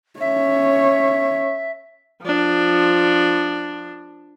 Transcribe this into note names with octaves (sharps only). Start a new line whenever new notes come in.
C#4 C#5 E5
F3 D4